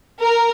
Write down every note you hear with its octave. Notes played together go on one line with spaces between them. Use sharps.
A#4